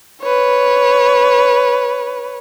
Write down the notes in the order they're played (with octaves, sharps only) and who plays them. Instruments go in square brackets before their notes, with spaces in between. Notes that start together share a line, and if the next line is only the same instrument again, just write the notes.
[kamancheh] B4 C#5